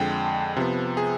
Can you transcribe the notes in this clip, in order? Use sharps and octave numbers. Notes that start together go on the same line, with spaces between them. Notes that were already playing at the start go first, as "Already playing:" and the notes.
Already playing: F2 D3 G#3 G5
C3 F3 B3
G#4